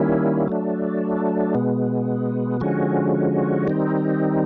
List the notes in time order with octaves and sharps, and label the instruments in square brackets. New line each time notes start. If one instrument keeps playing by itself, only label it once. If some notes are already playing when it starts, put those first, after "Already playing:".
Already playing: [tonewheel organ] D#3 G3 A#3 C#4 E4
F#3 A3 D4
B2 G#3 B3
D3 F3 G#3 C#4 F#4
D#3 G3 C4 D#4